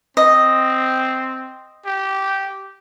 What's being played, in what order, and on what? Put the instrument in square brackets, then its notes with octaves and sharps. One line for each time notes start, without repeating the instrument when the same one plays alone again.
[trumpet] C4 [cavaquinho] D#5
[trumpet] G4